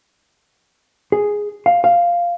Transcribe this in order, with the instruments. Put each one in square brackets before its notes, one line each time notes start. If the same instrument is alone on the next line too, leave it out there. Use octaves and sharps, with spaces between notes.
[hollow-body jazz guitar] G#4
F5
F5